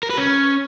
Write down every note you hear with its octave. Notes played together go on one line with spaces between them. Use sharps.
A#4
B4
C#4